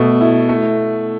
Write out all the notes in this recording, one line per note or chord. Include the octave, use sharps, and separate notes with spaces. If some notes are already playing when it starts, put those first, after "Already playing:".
Already playing: B2 A3
E4
A3